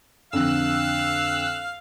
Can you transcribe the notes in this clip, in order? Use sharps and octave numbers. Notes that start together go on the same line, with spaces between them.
F2 D3 F5 E6 F#6